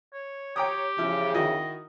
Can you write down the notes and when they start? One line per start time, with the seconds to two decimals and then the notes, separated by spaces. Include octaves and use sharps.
0.13 C#5
0.56 G4 C#5 G5 A#5 D#6
0.98 E2 C#3 F3 E4
1.34 D#3 E4 F#4 D#5